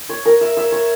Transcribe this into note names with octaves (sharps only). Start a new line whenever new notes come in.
C#5
A#4
E5
E5
C#5